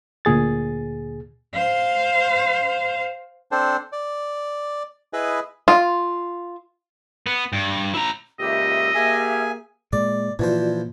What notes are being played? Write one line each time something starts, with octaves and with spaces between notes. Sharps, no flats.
D2 A#2 G#4 A6
C5 F5
C4 D4 A4 C5
D5
E4 G#4 B4 D#5
F4
B3
G2
E4 A#5
C#2 A#2 G4 D#5 E5 E6
A#3 G4 G#4 G#5
A#2 G#3 D5
A#2 E3 F3 F4 F#4 C5 D5